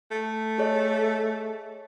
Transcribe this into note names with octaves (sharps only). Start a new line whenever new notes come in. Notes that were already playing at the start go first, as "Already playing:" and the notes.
A3
G#4 C#5 D#5